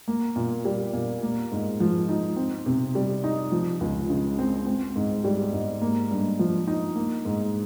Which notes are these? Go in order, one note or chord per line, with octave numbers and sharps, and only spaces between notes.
A#3
A#2
G3
A#2
A#3
G#2
F3
D#4
C4
C3
G3
D#4
F3
C#2
C#3
C4
C4
G#2
G3
G#2
A#3
G2
F3
D#4
A#3
G#2